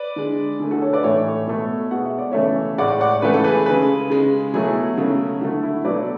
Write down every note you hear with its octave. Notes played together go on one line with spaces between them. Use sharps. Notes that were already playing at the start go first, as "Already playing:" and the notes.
Already playing: B4 D5
D3 G#3
D3 A3 G#4
F#4 A4
A4 C#5
B4 D5
A2 E3 A3 C#5 E5
B2 A3
B2 G#3 F#5
E5
D5
C#3 E3 A3 C#5 E5
A2 G#3 D5 F#5
D5 F#5
C#3 E3 A3 B4
A4
G#4 B4
C#3 G#3 G#4 B4
C#3 G#3
B2 F#3 A3 E4 G#4
C#3 F#3 A3
D3 A3 F#4
E4
B2 F#3 A3 B4 D5